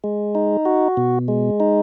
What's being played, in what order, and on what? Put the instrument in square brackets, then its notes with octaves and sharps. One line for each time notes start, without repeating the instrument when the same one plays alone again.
[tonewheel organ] G#3
D#4
F#4
B2
G#3
D#4